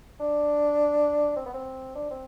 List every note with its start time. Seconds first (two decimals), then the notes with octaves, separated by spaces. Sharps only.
0.20 D4
1.37 C4
1.46 B3
1.54 C4
1.96 D4
2.11 C4